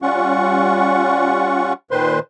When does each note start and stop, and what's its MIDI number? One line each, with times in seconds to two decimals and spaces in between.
0.02 1.73 55
0.02 1.73 61
0.02 1.73 65
0.02 1.73 78
0.02 1.73 85
1.91 2.19 46
1.91 2.19 51
1.91 2.19 71
1.91 2.19 72
1.91 2.19 84